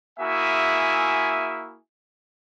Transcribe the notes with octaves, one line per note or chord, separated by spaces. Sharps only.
A#3 E4 F#4 G#4 E5 G#5